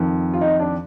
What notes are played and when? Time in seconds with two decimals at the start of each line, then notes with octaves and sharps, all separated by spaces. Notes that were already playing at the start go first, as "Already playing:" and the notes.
Already playing: F2 D#3
0.34 F4
0.41 D#4
0.60 D4